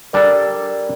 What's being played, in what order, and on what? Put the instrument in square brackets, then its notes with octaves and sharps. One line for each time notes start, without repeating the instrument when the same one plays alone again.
[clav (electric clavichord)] G3 D4 A4 [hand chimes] A#4 D5